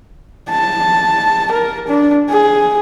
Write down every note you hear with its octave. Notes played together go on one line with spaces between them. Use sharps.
A5
A#4
D4
G#4